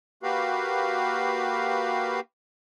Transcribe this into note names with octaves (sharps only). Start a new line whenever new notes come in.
A#3 F#4 G4 B4 F5